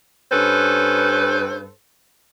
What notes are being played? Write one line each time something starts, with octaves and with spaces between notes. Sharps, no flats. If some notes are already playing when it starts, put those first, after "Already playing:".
G2 C#4 A4 B4 C5